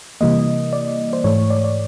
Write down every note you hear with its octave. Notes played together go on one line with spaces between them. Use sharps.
C3 E3 G3 A#3 D#5
D5
C5
G#2 E3 A3 C#5
D5
D5